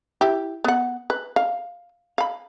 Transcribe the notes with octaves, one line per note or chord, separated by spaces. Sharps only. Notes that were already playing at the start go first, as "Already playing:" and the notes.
E4 G4
B3 F#5
B4
F5
F5 B5